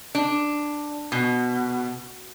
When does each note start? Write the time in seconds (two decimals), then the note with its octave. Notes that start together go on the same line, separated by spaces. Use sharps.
0.15 D4
1.12 B2